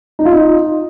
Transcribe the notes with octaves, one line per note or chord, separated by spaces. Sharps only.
D#4
F4
D#4